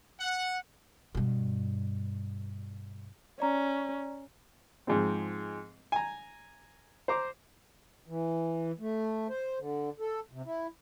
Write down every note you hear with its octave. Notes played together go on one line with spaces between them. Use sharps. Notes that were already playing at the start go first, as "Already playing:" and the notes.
F#5
G2 B2
C#4 D5 A#5
G#2 F3 G#3 C4
G#5 A#5
C5 A#5 D6
E3
A3
C5
D3
A4
C3
E4